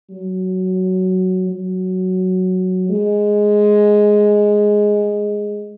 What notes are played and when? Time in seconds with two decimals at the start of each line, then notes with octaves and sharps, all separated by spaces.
0.10 F#3
1.49 F#3
2.89 G#3